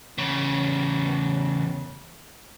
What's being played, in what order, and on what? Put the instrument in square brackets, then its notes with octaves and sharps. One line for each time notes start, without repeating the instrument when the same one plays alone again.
[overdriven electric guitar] E2 C#3